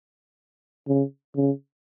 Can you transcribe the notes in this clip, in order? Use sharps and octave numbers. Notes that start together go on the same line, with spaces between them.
C#3
C#3